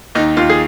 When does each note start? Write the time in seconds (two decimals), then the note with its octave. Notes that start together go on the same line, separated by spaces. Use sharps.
0.15 D#2 D#4
0.37 D#2 F4
0.50 G#4